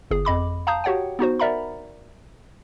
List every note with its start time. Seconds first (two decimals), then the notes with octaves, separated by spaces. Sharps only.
0.11 G1 G#4
0.25 F2 D#5 B5 D6
0.67 F5 A5 A#5 D#6 G6
0.84 F#4 G4 C#5 F#5 G5
1.19 B3 D#4 F#4 C5
1.39 A#4 D5 E5 F#5 A#5 B5